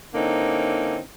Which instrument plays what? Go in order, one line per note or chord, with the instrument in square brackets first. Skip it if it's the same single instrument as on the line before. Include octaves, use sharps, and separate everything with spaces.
[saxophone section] D3 A#3 C4 C#4 D#4 E4